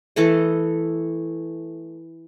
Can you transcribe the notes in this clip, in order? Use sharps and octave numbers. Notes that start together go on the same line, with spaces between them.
E3 A3 A4 D#5